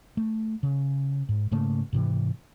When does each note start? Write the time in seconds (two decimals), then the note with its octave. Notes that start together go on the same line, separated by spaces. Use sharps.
0.17 A3
0.63 C#3
1.29 G#2
1.51 G#2 C#3 A3 A#3
1.93 G#2 C3 E3